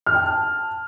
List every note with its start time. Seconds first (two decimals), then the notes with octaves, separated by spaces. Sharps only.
0.06 F6
0.14 G5
0.22 A5